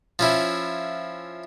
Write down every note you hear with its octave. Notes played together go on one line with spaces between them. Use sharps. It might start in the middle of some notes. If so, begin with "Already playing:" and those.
F3 C#4 E4